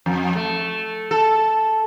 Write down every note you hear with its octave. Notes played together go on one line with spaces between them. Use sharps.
F2
A3
A4